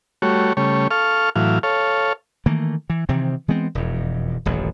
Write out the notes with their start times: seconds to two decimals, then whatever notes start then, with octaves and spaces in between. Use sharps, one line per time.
0.22 G3 A3 F#4 C#5
0.57 C#3 G3 A3 C#5
0.91 A4 F5 C#6 F6
1.36 A2 E3 F#3 F5
1.63 A4 C#5 F5
2.46 D#3 E3 A3 A#3
2.90 E3
3.09 C3 D#3 E3 C4
3.48 E3 G#3 B3 C4
3.75 E1 F2
4.46 D#1 A1 F#2